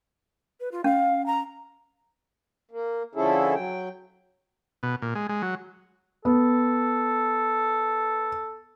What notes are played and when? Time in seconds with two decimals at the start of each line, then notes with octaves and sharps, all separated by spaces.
0.60 B4
0.72 F4
0.84 C#4 F5
1.26 A#5
2.71 A#3
3.15 D3 F3 C#4 E4 G#4 A4
3.55 F#3 G5
4.83 B2
5.02 A#2
5.15 G#3
5.29 G#3
5.42 F#3
6.25 B3 A4